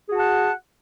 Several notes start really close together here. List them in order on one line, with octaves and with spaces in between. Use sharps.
G#4 F#4 A5 F#5